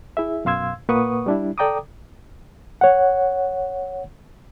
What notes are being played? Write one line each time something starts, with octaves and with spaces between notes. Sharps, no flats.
E4 G#4 E5
F#2 B2 F5 C6 E6 G#6
A#2 A#3 B4 F#5 C#6 D#6
G3 D4 E4
A4 D5 G5 A#5 D6 D#6
C#5 F#5